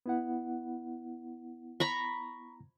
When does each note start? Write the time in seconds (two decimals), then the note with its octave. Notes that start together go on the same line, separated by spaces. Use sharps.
0.06 B3 E4 F#5
1.80 A#5 B5 C#6